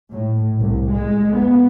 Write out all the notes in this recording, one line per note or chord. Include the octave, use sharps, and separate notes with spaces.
A2
C2
G#3
B3